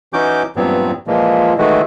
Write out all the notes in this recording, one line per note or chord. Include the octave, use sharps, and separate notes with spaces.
E3 C#4 D#4 F#4 D6 G6
G2 A#2 E3 F#3 B3 C4
A#2 E3 F3 G#3 A#3
D#3 E3 G#3 A3 F#4